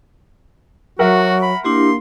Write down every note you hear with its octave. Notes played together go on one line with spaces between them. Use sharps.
F#3 F#4 A#4 E5 F#5
B5
A#3 D4 E4 G4 C6